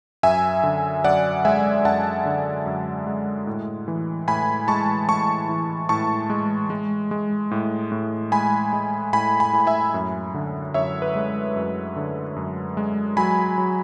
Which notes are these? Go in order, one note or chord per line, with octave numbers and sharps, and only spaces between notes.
F#2 E5 G#5
D3
F#2 D5 F#5
G#3 E5 G#5
F#2 F#5 A5
D3
F#2
G#3
A2
E3
A2 G#5 B5
G#3 A5 C#6
A2 A5 C#6
E3
A2 A5 C#6
G#3
G#3
G#3
A2
A2
G#3 G#5 B5
G#3
A2 G#5 B5
G#5 B5
A2
E5 G#5
F#2
D3
F#2 C#5 E5
B4
G#3
F#2
D3
F#2
G#3
F#3 G#5 B5
F#3